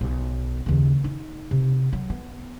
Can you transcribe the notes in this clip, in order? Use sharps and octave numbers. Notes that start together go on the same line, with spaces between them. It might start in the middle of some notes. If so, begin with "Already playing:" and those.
B1
D#2 C#3
D#4
C3
F#3
B3